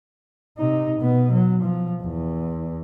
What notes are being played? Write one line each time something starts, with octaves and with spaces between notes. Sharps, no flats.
C3 D#4
B2 B3
F#3
F3
E2